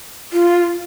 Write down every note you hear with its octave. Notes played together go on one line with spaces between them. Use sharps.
F4